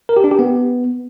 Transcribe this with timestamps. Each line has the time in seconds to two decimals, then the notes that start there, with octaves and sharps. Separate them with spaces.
0.09 A#4
0.17 G4
0.24 D4
0.31 G4
0.39 B3